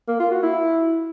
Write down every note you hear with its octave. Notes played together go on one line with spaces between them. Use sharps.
A#3
F4
F#4
E4